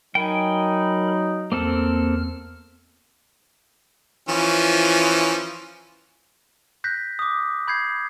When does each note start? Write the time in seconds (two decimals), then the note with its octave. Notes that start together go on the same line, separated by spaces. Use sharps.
0.15 F#3 D#4 A#4 G5 G#5 B5
1.52 E2 A#3 C4 A4 F6
4.29 E3 F3 C#4
6.84 F#6 G6 A#6 B6
7.19 D6 D#6
7.68 B5 G6 G#6 C7